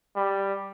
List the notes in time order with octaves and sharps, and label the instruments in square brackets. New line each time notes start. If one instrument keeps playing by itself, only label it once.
[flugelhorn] G3